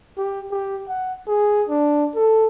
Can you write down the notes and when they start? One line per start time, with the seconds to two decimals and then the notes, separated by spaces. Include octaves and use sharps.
0.18 G4
0.51 G4
0.89 F#5
1.28 G#4
1.69 D4
2.15 A4